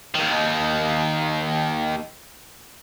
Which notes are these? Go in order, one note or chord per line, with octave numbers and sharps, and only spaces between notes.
D#2 D#3